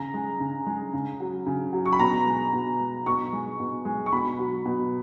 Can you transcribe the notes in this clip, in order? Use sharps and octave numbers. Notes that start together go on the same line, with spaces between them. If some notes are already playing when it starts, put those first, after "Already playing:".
Already playing: C#3 A#5
G#3
C#3
G#3
C#3
F#3
C#3
F#3
C#6
B5
B2 A#5
G#3
B2
G#3
B2 C#6
G#3
B2
G#3
C#6
B2 B5
F#3
B2